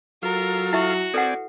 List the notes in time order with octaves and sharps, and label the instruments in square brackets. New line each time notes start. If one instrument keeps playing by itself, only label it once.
[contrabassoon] F#3 [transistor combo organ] F4 A4 F5 [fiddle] A#4
[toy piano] E4 E5 C#6 [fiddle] F#4
[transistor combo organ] C4 D5 G#5 [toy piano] A4 B4 F#5